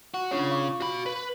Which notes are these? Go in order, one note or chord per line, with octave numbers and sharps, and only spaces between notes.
F#4
C#3 D4 F4 C#5
F5 C#6 D6
F#4 B5
B4